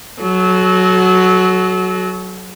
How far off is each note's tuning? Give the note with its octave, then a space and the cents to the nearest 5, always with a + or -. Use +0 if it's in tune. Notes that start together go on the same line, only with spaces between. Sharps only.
F#3 +0 F#4 +0 A4 -40